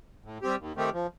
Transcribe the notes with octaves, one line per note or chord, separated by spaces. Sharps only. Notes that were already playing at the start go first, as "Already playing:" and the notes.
A2
G3 C4 G4
D#2
D#3 A3 C4 G4
F3